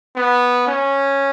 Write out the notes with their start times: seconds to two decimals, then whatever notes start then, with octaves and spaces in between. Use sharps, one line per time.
0.16 B3
0.67 C#4